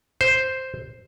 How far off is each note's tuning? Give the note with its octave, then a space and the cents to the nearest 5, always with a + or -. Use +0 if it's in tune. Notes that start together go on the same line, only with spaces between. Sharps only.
C5 +0